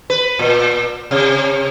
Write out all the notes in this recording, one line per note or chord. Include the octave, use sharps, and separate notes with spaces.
B4
A#2
C3